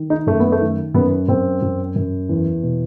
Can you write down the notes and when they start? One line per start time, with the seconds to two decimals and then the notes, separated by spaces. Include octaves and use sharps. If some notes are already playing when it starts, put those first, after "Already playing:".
Already playing: D#3
0.10 D#4
0.27 F#2 A3
0.40 B3
0.52 A3
0.61 D#3
0.94 F#2 B3
1.28 F#2 C4
1.62 F#2
1.96 F#2
2.29 E2
2.63 B2